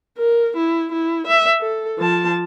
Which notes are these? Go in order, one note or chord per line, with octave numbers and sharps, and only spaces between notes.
A#4
E4
E4
E5
A4
F3 A5